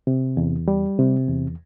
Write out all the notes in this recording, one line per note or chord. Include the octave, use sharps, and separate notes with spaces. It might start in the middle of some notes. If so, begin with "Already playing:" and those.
C3
E2
G3
C3
E2